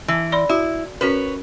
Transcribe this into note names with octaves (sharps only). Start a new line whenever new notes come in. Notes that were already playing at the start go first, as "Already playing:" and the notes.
E3
D5 B5 C6
E4 F#4
C#4 F#4 A#4 B4 C#5